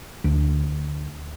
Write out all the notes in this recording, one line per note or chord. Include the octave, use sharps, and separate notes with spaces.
D2